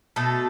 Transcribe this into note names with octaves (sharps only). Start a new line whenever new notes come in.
B2 A3 A4